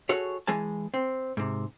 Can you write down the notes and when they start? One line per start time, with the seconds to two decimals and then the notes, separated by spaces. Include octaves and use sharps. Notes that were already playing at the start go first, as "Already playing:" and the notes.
0.09 F#4 G#4 A4 C#5
0.47 E3 G#3 G#4 G#5 A5
0.94 C4
1.37 G#2 C3